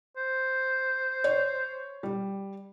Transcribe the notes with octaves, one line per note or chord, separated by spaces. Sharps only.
C5
C#5
G3